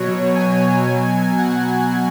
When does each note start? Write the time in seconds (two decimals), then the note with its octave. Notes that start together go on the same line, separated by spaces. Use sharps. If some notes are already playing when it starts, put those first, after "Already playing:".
Already playing: B2 F#3 C#5
0.35 G#5
0.86 B2 F#3
1.38 F#5